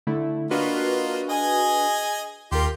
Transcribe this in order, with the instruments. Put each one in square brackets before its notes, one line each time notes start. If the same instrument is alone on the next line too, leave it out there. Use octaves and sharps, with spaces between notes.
[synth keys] D3 A3 E4
[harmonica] A#3 F4 D#5 [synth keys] D4 F#4 B4
[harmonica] G#4 D#5 G#5
[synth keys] D#2 A#4 [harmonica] F4 G4 C6